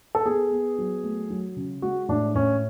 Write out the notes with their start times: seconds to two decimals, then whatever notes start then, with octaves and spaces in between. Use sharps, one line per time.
0.15 A4
0.25 B3 G#4
0.51 B3
0.78 F#3
1.04 A3
1.30 F#3
1.56 C#3
1.82 G#3 F#4
2.09 A2 D4
2.35 A2 C#4